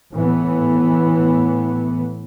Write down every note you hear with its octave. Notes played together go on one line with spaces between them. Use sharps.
A2 E3 B3